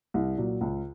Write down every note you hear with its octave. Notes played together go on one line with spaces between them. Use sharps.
C2
A#2 F#3
C#2